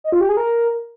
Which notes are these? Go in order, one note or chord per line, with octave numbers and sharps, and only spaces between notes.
D#5
F4
G4
G#4
A#4